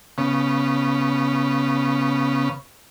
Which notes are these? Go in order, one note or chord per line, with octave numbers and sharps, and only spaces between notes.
C#3 B3